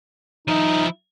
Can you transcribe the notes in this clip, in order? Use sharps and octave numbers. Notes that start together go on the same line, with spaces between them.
F3 D#4 E4